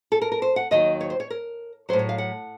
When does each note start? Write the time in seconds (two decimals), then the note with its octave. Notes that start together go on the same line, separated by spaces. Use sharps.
0.12 A4
0.22 A#4
0.32 A#4
0.42 C5
0.56 F#5
0.71 D#2 D#3 F#3 D#5
1.01 C#5
1.10 C5
1.20 C#5
1.30 A#4
1.89 F#3 C5
1.93 A2
1.99 C#5
2.09 F5
2.18 F#5